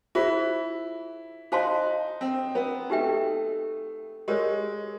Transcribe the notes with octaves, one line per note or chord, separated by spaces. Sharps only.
E4 F4 G#4 C5
D#4 C5 F5 A5 C6
C4
B3
A3 D#4 G4 B4 E5 G5
G#3 G4 A#4 C#5